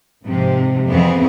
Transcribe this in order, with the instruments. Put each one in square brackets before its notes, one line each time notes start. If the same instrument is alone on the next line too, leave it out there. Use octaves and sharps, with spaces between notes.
[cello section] G#2 C3 F3
F2 E3 B3 C4 G#4